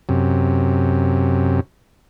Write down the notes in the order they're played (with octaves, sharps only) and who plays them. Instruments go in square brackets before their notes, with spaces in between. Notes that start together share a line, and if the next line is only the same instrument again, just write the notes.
[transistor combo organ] F#2 C3